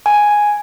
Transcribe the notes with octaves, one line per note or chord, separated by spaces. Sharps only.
G#5